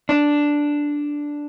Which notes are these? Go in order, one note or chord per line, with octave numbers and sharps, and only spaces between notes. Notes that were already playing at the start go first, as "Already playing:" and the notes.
D4